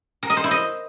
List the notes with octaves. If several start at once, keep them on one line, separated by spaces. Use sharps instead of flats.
A#4
D#5
C5
E4
D#5